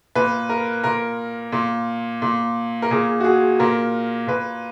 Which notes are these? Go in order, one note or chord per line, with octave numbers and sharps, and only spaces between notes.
A#2 B4
A#4
A#2 A#4
A#2
A#2
A#4
A#2 G#4
F#4
G#4
A#2 A#4
A#2 B4